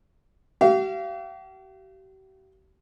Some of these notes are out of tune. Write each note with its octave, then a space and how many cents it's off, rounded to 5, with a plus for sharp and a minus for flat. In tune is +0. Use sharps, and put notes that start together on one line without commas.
G4 -45 F5 -35